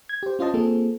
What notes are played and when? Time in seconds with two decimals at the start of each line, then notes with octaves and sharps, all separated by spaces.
0.09 G#6
0.23 G4 C5
0.39 C#4 F4 C5 D#5 A5
0.54 A#3 C4 F4 G#4 A4